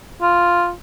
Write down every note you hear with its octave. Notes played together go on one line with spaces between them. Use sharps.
F4